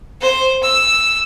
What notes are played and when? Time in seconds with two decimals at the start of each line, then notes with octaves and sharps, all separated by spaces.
0.21 C5
0.63 E6